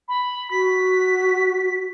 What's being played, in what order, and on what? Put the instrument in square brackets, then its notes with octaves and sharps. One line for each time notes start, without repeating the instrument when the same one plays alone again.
[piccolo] B5
[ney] F#4 [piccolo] B6